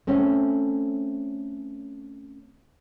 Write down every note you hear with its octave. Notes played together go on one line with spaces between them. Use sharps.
A3 C4 C#4